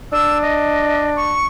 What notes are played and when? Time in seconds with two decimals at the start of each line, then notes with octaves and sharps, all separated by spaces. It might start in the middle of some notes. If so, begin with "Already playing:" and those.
0.13 D4 E6
0.42 D#5
1.16 C#6